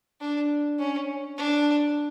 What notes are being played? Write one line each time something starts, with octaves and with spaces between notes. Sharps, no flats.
D4
C#4
D4